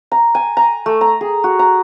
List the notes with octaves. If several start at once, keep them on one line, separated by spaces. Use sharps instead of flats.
A#5
G#5
A#5
A3
A#5
G#4
F#4
A#5